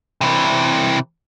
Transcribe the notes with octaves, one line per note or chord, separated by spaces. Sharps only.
C3 E3